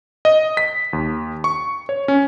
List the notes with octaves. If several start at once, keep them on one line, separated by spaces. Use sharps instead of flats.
D#5
B6
D#2
C#6
C#5
C#4